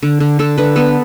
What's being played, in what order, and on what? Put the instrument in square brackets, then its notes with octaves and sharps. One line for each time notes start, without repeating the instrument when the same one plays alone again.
[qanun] D3
D3
D3 A4
D3 B4
B3 A4